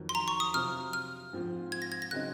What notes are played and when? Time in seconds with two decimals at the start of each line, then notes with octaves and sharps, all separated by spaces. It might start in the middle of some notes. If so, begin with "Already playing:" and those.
Already playing: F2 D#3 F#3
0.09 C6
0.15 A#5
0.28 C#6
0.40 D#6
0.53 C3 F#3 C4 F4 F6
0.93 F6
1.33 G#2 F3 C4 F4
1.72 G#6
1.82 A#6
1.92 G#6
2.02 A#6
2.11 C#3 F#3 C4 D#4 F#6